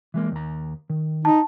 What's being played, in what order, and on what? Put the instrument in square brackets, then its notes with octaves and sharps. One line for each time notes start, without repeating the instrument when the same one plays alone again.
[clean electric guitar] E3 G#3 A#3
D#2 A#5
D#3
[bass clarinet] D#4 [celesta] A5